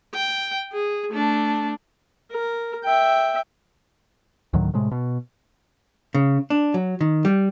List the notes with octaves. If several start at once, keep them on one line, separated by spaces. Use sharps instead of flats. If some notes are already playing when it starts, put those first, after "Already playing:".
G5
G#4
A3 D4
A#4
E5 G5
D2 A2 D#3 F#3
A2 C3 G#3
B2
C#3
D4
F#3
D#3
G3